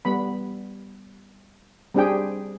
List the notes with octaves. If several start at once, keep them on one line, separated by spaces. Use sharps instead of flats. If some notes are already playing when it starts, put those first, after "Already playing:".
G3 B3 B5
G3 C4 D4 G4 G#4 G5